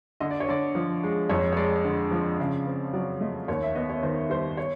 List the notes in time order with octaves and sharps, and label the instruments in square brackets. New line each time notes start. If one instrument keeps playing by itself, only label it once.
[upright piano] D3 D#5
D5
C#5
D3 D5
F3
G#3
F2 C#5
C#5
G#3 D5
D3
F3
C#3
C4
F#3 D5
A3 D#5
D#2 C#5
E5
B3 D#5
C#5
D#3 C5
G3 C5
C#5